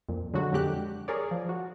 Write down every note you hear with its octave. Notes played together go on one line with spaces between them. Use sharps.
F2 A#2
D3 F#3 G#3 F#4
F2 D3 G#3 G4 F#6
G#4 A#4 C#5 D5
F3
F#4